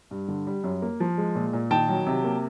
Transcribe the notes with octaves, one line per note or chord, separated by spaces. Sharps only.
G2
D3
G3
F#2
A#3
F3
G#3
A#2
A#2
D#3 G5 A5
F#3
C3
A#3